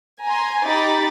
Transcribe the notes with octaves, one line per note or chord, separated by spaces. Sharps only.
G#5 A#5 C6
D#4 G4 B5 D6 A6